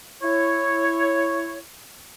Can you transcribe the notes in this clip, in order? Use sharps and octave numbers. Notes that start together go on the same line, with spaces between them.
E4 C#5